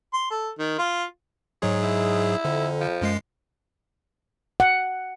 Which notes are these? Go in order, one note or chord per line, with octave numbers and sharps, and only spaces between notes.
C6
A4
D#3
F4
G#2 F#3 G#3 G#4 C#5
E4
F2 D3
F3
F#2 G#3 C7
F#5